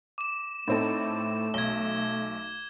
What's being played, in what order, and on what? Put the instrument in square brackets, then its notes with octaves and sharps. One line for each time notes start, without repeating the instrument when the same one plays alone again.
[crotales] D6 E7
[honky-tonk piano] A2 C4 A4 [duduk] A3 [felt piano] D#4
[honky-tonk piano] B1 [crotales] G#6 G7